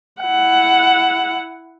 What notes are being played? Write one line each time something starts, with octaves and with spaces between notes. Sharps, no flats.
E4 F#5